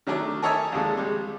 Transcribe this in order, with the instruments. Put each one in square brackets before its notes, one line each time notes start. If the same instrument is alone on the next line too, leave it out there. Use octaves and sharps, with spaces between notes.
[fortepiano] D#3 F#3 A3 D4
A4 A#4 C#5 D#5 E5 G#5
A#1 D#2 G#3 A4
G3 G#3